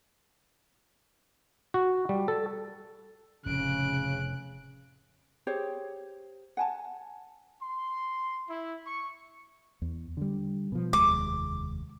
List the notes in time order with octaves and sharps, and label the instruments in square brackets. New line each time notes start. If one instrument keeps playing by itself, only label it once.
[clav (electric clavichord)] F#4
G3
A4
[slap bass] F1 A2 [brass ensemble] C#3 [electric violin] F#6 D7
[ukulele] G4 G#4 C5 C#5
F#5 G#5 A5
[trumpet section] C6
E4
C#6
[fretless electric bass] E2
D3 G3
B2 F3
[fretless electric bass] F1 D#2 G#3 [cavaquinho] D6